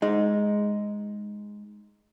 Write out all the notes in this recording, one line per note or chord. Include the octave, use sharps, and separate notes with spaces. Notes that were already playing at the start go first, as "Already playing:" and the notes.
G#3 D#4